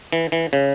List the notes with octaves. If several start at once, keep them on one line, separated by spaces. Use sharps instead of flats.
E3
E3
C#3